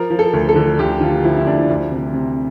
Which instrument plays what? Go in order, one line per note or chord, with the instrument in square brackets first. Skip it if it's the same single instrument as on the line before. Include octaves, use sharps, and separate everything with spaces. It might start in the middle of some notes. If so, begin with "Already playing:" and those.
Already playing: [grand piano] F3 A#4
F3
A4
D2
A4
D3
D2 G4
D3 F4
F3 E4
E4
D2 D4
D2
C3
C3